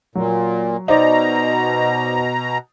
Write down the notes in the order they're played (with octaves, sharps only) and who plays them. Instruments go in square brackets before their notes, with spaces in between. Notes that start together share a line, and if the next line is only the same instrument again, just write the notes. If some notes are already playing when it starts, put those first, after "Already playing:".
[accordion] A#2 [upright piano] F#3
[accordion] B2 A#5 [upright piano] D#4 C5 D5